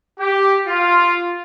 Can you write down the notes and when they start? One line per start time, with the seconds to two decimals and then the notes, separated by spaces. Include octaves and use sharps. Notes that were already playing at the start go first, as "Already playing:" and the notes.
0.19 G4
0.66 F4